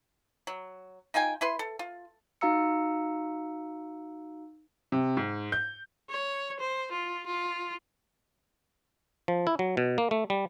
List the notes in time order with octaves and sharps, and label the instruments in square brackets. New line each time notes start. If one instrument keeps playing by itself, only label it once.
[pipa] F#3
D#4 F4 G5 G#5
E4 B4 C6
A4
F4
[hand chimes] D#4 F#4 F5 A#5 E6 C#7
[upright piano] C3
G#2
G6
[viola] C#5
C5
F4
F4
[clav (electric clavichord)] F3
E4
F#3
B2
A#3
A3
G3